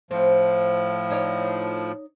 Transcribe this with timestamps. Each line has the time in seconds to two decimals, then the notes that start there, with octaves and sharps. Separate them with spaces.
0.11 A2 F3 C4
1.10 D#4 C#5 D5